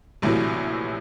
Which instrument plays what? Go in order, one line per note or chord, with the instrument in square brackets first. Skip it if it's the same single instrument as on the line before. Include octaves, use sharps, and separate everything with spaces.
[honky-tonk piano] A#1 A2 C3 E3 F#3